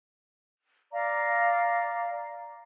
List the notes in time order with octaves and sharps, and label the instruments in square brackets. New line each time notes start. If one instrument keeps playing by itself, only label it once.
[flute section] D5 F5 A#5 D6